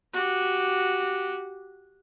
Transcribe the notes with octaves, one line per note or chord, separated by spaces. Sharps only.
F#4 G4